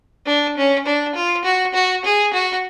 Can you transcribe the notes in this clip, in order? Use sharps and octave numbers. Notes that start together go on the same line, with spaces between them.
D4
C#4
D4
F4
F#4
F#4
G#4
F#4